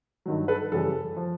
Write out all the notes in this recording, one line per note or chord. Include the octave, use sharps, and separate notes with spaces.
G2 D#3 F#3
A4 B4
F#2 C#3 E3 G3 A4
F3